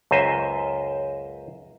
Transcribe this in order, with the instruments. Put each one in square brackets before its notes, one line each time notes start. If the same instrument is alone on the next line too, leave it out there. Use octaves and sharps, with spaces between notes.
[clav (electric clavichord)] C#2 F#2 C5 D#5 E5